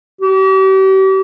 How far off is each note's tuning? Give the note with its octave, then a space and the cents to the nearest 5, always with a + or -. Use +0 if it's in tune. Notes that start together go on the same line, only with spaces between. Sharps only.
G4 -40